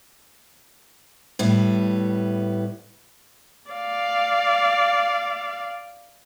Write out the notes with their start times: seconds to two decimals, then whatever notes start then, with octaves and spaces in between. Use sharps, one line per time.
1.39 A2 G3 B3
3.70 D5 F5